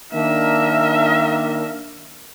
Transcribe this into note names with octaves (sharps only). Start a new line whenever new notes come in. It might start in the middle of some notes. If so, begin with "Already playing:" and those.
D#3 A#3 D4 A#4 E5